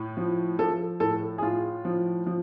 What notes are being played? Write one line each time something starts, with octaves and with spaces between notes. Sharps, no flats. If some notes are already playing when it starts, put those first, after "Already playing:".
Already playing: A2
F3
F3 A4
A2 A4
G#4
A2 F4
F3
F3